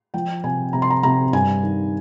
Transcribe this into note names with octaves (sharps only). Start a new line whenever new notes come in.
F3 G5
C3 G#5
C3 A#5
C6
A#5
C3 A#5
G2 G#5
D#3